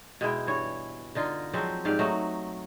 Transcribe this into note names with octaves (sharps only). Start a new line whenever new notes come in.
B2 G#3 E4 G5
G2 E3 C#5
D3 D#4 F4
F3 F#3 G#3 C4
G#2 G4 D5 F5
F#3 A3 D#4